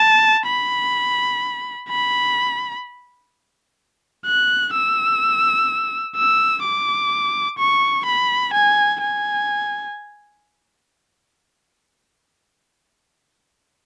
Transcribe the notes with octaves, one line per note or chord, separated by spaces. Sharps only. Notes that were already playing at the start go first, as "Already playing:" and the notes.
Already playing: A5
B5
B5
F#6
E6
E6
D6
C#6
B5
G#5
G#5